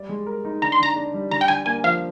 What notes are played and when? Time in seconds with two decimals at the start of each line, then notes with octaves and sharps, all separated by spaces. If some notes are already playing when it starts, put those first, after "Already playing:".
Already playing: G3 D5
0.09 G#3
0.27 A#4
0.45 D#4
0.62 D3 A#5
0.72 C6
0.80 D3 A#5
0.96 D4
1.14 G3
1.31 D3 A#5
1.41 G5
1.48 D3 G#5
1.66 A#3 G#5
1.84 F3 F5